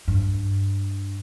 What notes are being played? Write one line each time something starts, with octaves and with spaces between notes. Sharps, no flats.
G2